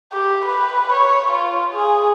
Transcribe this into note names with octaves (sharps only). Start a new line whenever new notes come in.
G4
B4
C#5
F4
G#4